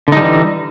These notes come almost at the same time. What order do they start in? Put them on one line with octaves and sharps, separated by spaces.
D3 D#4 G3 E3